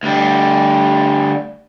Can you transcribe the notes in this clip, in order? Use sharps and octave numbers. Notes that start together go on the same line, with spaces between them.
D2 G3